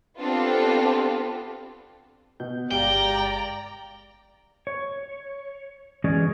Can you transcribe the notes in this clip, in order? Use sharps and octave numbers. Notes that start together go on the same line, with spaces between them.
B3 C4 D4 F4 G4 A4
B2 G6
G1 G#3 G4 D5 F5 G5 A#5
C#5
E3 G#3 C#4 F#4 G#4 D5